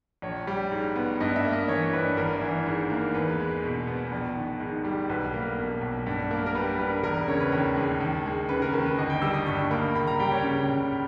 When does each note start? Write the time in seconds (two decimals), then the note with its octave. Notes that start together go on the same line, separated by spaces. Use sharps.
0.22 A#1 C#5
0.47 G3
0.71 G#2
0.96 B3
1.20 G2 D#5
1.36 E5
1.45 A#3
1.53 D#5
1.68 E3 C#5
1.93 G2 B4
2.17 G#1 A#4
2.41 E3
2.66 G#2
2.90 A#3
3.14 E2 B4
3.40 G#3
3.64 B2
3.87 B3
4.12 A#1
4.36 D#3
4.60 G#2
4.84 G3
5.09 B1 B4
5.34 A#3
5.58 B2
5.81 B1
6.07 G2
6.31 A#3
6.46 A#4
6.55 G3 B4
6.79 G2 B4
7.03 E1 A#4
7.27 C#3 C#5
7.41 B4
7.52 D#2 A#4
7.76 G#3
8.00 D#2
8.26 G#3
8.49 C#3 B4
8.62 A#4
8.74 D#2 A#4
8.86 B4
8.99 G1 D#5
9.10 G5
9.22 G3 E6
9.34 D#6
9.46 G2 C#6
9.71 A#3 B5
9.95 C#2 B5
10.07 A#5
10.19 G3 G5
10.32 C#5
10.43 C#3
10.69 C#2